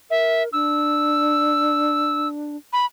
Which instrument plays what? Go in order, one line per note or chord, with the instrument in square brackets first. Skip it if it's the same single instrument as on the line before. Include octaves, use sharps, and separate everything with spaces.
[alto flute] A#4 [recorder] E5
[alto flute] D4 [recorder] E6
[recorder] B5